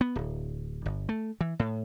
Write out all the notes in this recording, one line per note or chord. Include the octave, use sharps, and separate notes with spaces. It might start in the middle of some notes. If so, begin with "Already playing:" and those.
B3
D1
G1
A3
E3
A2